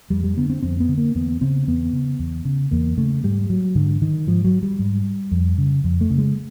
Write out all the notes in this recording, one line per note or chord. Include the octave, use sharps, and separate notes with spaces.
F2 G3
G3
D3 B3
C4
F2 C4
B3
D3
A#3
E2 B3
C#3 C4
E2 B3
C#3
E2
C#3
E2 A#3
C#3 A3
G#2 G3
F#3
G#2 D3
D#3
G#2 F3
F#3
G3
G#2
F2
C#3
F2
A3
C#3
G#3